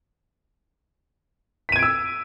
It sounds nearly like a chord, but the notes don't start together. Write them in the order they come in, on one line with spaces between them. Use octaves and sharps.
B6 D#7 G#6 D7 E6